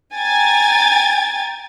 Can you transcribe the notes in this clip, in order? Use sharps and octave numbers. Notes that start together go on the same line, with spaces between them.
G5 G#5 A#5 G#6 A6